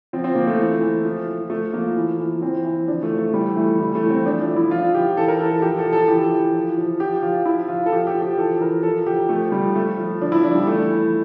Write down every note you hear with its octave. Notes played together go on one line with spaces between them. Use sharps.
F3 C4
C4
F3 A#3
A3
E3
E3
F3
F3
F3 A3
F3 A#3
E3
E3
E3 C4
E3
F3 D4
A3
F3
A3
E3 G3
E3 A3
E3 G3
A3
E3
C4
F3 D4
D4
F3
E4
F3 F4
F3 G4
E3 A4
A#4
E3 A4
A4
F3 G4
A4
F3
A4
E3 G4
E3
F3
F3
F3 G4
F3 F4
F3 E4
F3 F4
A4
F3 G4
G4
F3
G4
E3 A4
E3 A#4
F3 A4
F3 G4
F3 A3
F3 G3
F3 A3
F3
F3 D4
E4
F3 D4
G3
E3 A3
E3